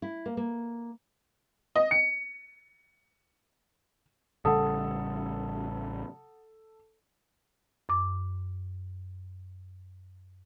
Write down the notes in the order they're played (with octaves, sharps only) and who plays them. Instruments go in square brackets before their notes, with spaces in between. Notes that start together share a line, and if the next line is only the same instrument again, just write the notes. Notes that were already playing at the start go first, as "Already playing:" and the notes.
[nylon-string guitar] E4
A#3
A#3
[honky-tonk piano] D#5
C#7
[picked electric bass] A1 C#3 G3 [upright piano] A4 [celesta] F#5 D#6
[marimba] F#2 D6